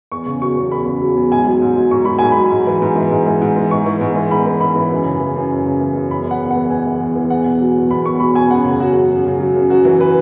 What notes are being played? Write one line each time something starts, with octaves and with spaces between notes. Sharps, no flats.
E2 C#6
C#3
F#3 C#6
E2
E2 B5
C#3
F#3
E2
G#2 G#5
F#3
G#2
F#3
G#2 C#6
F#3 B5
G#2 G#5
F#3 B5
G#2
E3
G#2
E3
G#2
E3
G#2
E3
G#2 C#6
E3
G#2
E3
G#2 B5
E3
G#2 B5
E3
F#2
C#3
E3
F#2
F#2
C#3
E3
F#2
E2 B5
E3
F#5
E2
F#5
E3
E2 G#5
E3
E2
E3
E2 F#5
B2
F#3
E2
E2 B5
B2 C#6
F#3 B5
E2 G#5
F#2 F#5
C#3
F#3 F#4
F#2
F#2
C#3
F#3
F#2
F#2 F#4
E3
B4